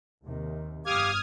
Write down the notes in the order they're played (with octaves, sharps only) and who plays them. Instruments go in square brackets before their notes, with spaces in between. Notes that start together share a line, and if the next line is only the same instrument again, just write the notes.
[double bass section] D#2 C3 D#3
[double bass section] G1 F2 [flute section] G4 F5 D6 [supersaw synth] D#6 F6 G#6